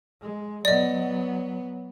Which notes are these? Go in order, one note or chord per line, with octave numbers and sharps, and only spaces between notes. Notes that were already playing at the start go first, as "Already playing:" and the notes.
G#3
F#3 B3 D5 D#5